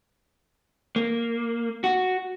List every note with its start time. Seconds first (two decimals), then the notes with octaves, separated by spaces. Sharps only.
0.96 A#3
1.84 F#4